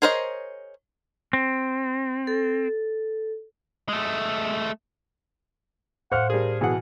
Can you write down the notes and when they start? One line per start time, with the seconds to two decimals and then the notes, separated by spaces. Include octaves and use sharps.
0.02 G#4 A#4 C5 C#5 D#5
1.33 C4
2.27 A4
3.88 G#3 A3
6.12 A2 C5 F5 F#5 F6
6.30 G3 D4 G#4 A#4
6.61 B2 E3 G#4 F#5